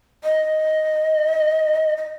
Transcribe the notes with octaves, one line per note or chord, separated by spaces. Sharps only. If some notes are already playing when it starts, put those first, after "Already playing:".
D#5
D#5